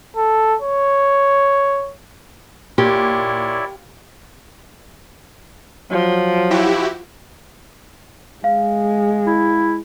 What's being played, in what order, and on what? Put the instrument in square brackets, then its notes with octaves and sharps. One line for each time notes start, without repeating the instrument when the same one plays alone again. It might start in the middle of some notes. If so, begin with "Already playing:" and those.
[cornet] A4
C#5
[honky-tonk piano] A#2 [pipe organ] E4 C#5 D5 [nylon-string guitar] G4
[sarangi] F3 [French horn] F#3
[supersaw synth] E4 F#4 G4
[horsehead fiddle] G#3 [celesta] F5
[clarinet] E4